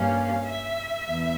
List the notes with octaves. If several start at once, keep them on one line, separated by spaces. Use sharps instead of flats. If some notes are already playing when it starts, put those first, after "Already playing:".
Already playing: G2 G3 A#3 C#4 F5
E5
E2